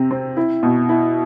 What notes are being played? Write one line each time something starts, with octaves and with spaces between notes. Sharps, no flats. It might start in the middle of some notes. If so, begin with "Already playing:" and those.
Already playing: C3 C4
C4
E4
B2
E4